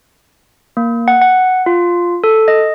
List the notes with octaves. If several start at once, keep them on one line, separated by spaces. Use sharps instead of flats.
A#3
F#5
F#5
F4
A4
D#5